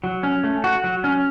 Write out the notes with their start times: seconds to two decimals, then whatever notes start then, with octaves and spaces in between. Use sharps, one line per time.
0.04 F#3
0.23 C#4
0.44 A3
0.64 F#4
0.84 F#3
1.04 C#4